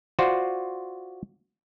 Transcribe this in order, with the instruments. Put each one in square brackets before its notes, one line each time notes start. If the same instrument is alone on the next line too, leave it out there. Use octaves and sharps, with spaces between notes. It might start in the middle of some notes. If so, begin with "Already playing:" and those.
[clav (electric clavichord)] F4 F#4 C5 D5